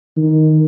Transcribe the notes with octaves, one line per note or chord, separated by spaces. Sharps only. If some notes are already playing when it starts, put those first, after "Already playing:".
D#3